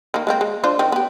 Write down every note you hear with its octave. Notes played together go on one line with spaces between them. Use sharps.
D#3 A#3
G#3 A#3 C4
G#3
D4 F4 C5
D#3 C4
B3 G4